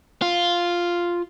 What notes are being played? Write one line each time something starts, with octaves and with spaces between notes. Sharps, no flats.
F4